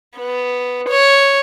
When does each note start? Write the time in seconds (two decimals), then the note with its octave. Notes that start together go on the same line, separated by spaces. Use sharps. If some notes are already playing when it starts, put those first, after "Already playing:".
0.16 B3
0.89 C#5